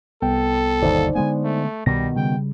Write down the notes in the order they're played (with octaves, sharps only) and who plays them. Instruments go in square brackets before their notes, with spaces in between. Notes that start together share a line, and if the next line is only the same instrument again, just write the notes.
[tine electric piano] C2 B3 G5 [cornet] A4
[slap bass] G1 D#2 B2 [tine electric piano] D#4 C5 D5
[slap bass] D3 G#3 B3 [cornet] G#5
[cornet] A3
[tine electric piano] C2 A#6 [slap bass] B2 D#3 [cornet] G3
[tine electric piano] C#3 G3 [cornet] G5